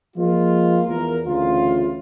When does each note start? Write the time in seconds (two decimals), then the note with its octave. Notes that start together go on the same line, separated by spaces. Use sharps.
0.17 F3 G#3 A#3 F4
0.88 E2 E3 F4 A#4
1.26 D2 C#3 E3 F4